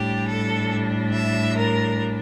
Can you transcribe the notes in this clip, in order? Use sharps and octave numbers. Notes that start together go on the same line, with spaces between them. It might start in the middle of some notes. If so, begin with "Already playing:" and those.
Already playing: A2 G3 D4 G4
A4
E5
A#4